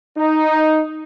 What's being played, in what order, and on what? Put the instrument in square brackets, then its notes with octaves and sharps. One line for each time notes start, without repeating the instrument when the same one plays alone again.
[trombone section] D#4